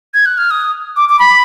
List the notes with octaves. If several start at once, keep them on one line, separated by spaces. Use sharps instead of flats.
G#6
F#6
F6
D#6
D6
D6
B5